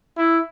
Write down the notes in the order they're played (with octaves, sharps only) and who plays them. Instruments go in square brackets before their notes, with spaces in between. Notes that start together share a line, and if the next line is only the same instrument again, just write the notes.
[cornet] E4